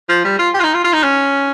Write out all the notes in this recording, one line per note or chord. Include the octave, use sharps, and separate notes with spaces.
F3
G3
F4
G4
F4
D#4
F4
F4
D#4
C#4